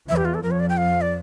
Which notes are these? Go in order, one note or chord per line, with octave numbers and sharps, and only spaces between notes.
E2 E3 E5
G4
F4
A4
F2 F3 A#4
C#5
D5
G5
F5
D5